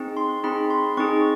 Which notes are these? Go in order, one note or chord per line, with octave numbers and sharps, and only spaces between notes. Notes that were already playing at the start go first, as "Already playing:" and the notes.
Already playing: C4 D#4 G#4
C6
C4 D#4 G#4 B5
C6
C4 D#4 G#4 C#6